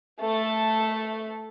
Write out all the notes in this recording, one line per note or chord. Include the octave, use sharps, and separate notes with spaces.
A3 A4